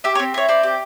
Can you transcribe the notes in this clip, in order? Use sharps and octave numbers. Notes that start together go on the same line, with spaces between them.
G4 E5
C#5
C4
E4 C#5
C4 D5
G4